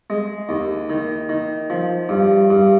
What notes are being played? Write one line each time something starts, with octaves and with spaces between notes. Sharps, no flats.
G#3
D#2
D#3
D#3
F3
G2
G2